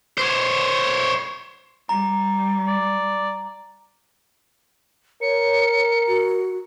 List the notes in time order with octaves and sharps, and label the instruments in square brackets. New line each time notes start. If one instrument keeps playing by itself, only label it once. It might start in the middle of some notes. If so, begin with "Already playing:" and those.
[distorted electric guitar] C5 C#5
[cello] G3 [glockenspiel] A#5
[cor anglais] D5
[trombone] A#4 [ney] C#5 [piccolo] C#7
[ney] F#4